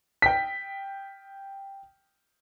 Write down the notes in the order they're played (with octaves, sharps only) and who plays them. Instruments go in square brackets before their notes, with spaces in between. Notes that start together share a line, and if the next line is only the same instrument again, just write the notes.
[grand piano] G5 B6